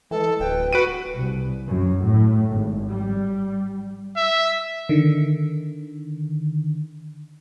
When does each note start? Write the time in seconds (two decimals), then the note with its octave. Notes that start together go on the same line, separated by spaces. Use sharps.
0.11 E3 G#3 A4
0.40 D1 B4 G5
0.73 F#4 B4 D7 D#7
1.16 C2
1.68 F#2
2.03 A2
2.50 G#1
2.90 G3
4.17 E5
4.89 D3 D#3